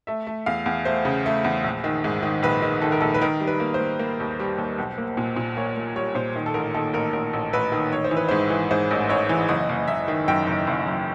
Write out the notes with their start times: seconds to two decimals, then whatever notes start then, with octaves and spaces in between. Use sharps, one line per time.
0.07 A3 E5
0.27 A3
0.46 E2 F5
0.66 E2
0.85 A3 C5
1.05 C#3
1.26 A3
1.44 E2
1.64 A#1
1.84 D#3
2.04 G#2
2.23 D#3
2.43 A#1 B4
2.62 D#3
2.82 D#3 A4
2.92 A#4
3.01 A#1 A4
3.14 B4
3.21 D#3 A#4
3.40 G3
3.47 B4
3.60 A#3
3.74 C5
3.80 A#3
3.99 A#3
4.20 D#2
4.40 G3
4.58 D#2
4.78 B1
4.98 A#3
5.17 A#2
5.36 A#2
5.57 A#3 C#5
5.76 A#3
5.95 G3 C#5
6.15 A#2 C5
6.36 D#3
6.46 A4
6.54 A1 A#4
6.74 D#3 A4
6.93 A1 A#4
7.13 A1 A#4
7.33 A1
7.53 A1 B4
7.72 D#3
7.91 A1 C#5
8.04 C5
8.11 E3
8.17 B4
8.29 G#2 C5
8.50 E3
8.71 G#2 C5
8.91 A1
9.09 A1 C#5
9.29 E3
9.48 F#1 D#5
9.69 F#1
9.88 F#1 E5
10.08 D#3
10.28 F#2 G5
10.47 F#1
10.67 F#1
10.86 F#2